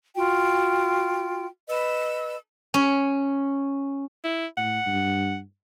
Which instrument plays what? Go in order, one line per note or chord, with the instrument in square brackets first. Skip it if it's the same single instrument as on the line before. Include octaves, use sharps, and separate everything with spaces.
[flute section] F4 F#4 G5
B4 D#5 E6
[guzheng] C#4
[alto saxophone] E4
[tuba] A2 [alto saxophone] F#5
[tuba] G2